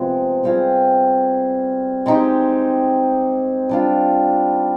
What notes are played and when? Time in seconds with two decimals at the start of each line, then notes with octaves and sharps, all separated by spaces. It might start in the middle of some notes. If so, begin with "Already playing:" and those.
Already playing: C3 F3 G#3 B3
0.43 G3 C4 F4 G#4
2.06 G#3 C4 D#4 G4
3.69 G3 D4 F4